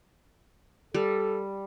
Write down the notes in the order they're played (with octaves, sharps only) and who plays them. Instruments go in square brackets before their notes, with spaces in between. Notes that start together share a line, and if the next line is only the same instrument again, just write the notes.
[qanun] G3 [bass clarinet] A4